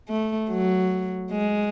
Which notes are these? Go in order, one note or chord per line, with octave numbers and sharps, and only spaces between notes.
A3
F#3
G#3